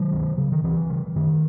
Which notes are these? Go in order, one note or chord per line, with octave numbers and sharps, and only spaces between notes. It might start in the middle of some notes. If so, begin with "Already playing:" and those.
Already playing: D#3 F#3
C#2
C#3
D#3
C#2 E3
C#3
F#2 D#3